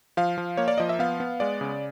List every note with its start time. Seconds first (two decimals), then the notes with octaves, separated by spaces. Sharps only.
0.17 F3 F5
0.38 F3
0.57 A#3 C#5
0.68 D5
0.78 F3 D#5
0.89 E5
0.99 B3 F5
1.20 B3
1.40 G#3 D5
1.61 C#3